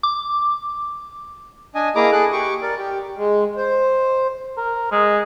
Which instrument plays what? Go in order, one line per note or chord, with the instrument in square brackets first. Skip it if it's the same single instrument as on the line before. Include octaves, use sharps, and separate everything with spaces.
[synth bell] D6
[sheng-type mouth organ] D4 D#5 G#5
A#3 E4 G#4 D#5 A#5 D6
G#4 A4 F#6
G4 C#6 D6
A#4 D5
G4
[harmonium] G#3
C5
[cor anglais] A#4
G#3